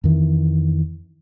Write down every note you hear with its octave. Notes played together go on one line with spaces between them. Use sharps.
F2 D#3 E3